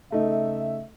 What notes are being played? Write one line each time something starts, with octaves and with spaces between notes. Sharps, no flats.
C#3 A3 D#4 E5